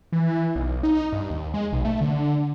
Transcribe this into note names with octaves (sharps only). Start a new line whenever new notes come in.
E3
B1
D#4
G2
D#2
G#3
B1
A3
D3